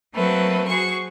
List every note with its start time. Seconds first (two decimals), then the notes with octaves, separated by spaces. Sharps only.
0.14 F#3 A3 A#3 C4 B4
0.68 F#4 G#4 C5 C#6